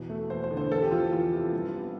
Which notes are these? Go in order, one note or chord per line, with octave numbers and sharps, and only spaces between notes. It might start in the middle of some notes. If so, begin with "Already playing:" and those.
Already playing: E2 B2
A3
E2 C5
C5
D3
C5
E2 A4
G4
F3 F4
E2 F4
C3
G2
B3